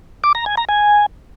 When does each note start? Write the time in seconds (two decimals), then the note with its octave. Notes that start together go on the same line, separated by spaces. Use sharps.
0.24 D6
0.35 A#5
0.46 G#5
0.57 A#5
0.69 G#5